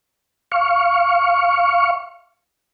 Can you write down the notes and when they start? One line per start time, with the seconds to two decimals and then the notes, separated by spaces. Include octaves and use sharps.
0.52 F5 C#6